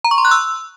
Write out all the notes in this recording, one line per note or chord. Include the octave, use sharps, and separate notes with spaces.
A#5
C#6
C6
F#6
E6